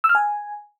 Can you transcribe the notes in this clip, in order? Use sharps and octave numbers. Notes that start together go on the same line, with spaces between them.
E6
F6
G#5